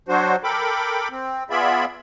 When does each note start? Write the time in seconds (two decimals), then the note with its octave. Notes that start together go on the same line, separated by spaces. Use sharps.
0.09 F#3 D4 F#4 C5
0.44 A4 A#4 G5 B5 D6
1.11 C4
1.50 B3 F4 G#4 D5 E5 B5